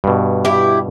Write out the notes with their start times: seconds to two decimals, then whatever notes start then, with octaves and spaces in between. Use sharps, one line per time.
0.04 G2 B2
0.45 E4 G4